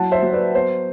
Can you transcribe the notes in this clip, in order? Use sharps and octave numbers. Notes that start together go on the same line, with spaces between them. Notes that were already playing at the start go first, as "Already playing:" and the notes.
Already playing: F#3 E4 F#5 A5
C5 E5
F#3
B4 D5
B3 C5